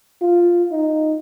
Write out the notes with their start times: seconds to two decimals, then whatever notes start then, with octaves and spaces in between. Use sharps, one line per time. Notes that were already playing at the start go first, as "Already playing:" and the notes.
0.22 F4
0.71 D#4